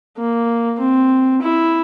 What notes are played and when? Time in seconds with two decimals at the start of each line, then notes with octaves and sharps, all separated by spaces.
0.17 A#3
0.79 C4
1.42 E4